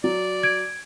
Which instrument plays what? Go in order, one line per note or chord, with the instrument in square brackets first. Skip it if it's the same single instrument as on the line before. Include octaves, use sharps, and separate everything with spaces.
[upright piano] F#3 [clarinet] D5
[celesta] G#6 D7